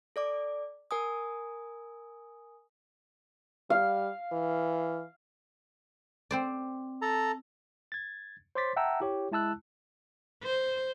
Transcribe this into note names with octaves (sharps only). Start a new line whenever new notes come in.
A4 D5 D6
A#4 G#5 D#6
G3 F5
E3
C4 C5 D5
A4 A5 A#5
G#6 A6
C5 C#5 C6 D6 A6 B6
E5 F#5 G5 A5 A#5 E6
E4 G4 C#5
G#3 E4 A5 E6 F#6
C5